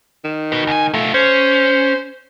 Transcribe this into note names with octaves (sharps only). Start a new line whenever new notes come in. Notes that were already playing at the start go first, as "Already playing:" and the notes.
D#3
F#4 B4
C#2 G#5
B2 A3 F4
C#4 C5